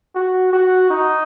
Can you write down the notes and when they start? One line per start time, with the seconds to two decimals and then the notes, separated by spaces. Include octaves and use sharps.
0.15 F#4
0.53 F#4
0.90 D#4